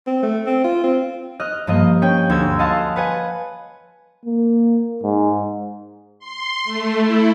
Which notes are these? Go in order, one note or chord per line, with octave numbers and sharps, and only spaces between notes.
C4
A3
C4
F4
C4
D#5 F6 F#6
G2 F3 A#3 D#5
C#4 G5
D2 D3 G#4 E6 G#6
D#5 F5 F#5 G#5 A5 C6
B4 F#5 G#5
A#3
G#2
C6
A3
E4